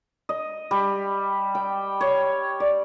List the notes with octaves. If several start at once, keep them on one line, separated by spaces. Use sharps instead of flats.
D#5
G3
G5
C#5
D5